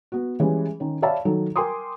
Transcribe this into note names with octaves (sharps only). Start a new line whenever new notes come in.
B3 F#4
E3 G3 G#3 C#4
D#3 C#4
C#5 D5 E5 F5 A5 B5
D#3 F#3 D#4 A4
A#4 G5 G#5 C6 D6 D#6